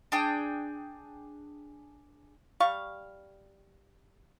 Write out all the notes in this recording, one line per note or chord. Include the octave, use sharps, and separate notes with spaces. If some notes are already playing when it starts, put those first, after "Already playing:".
D4 G#4 G5
G3 F5 C#6